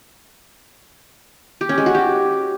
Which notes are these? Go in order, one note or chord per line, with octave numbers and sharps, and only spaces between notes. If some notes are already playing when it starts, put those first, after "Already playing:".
G4
C#4
G#3
F#4
G4